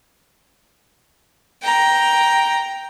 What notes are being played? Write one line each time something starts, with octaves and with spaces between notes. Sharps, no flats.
G5 A#5